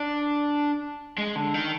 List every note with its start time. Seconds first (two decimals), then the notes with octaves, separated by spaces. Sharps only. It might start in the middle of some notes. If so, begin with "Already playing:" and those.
Already playing: D4
1.18 G#3
1.35 D3
1.54 D#3